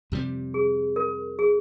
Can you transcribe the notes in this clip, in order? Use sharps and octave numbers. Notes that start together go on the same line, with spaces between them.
F2 C3 G3
G#4
A#4
G#4